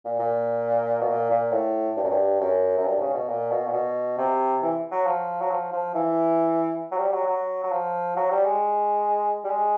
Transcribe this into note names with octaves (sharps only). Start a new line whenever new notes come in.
A#2
A#2
B2
A#2
A#2
A2
G2
F#2
G2
F#2
F#2
G2
C#3
B2
A#2
B2
A#2
B2
C3
E3
F#3
F3
F#3
F3
F3
E3
F#3
G3
F#3
F#3
F#3
F3
F#3
G3
G#3
G3
G#3